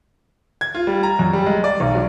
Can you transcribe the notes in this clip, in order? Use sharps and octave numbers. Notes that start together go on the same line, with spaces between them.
G#6
F4
G3
A#5
F#2
G3
G#3
D5
B1
F#3